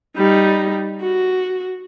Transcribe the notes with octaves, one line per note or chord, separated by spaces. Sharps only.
G3 D#4
F#4